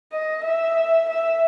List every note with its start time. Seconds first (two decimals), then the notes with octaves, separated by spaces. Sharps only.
0.12 D#5
0.44 E5
1.09 E5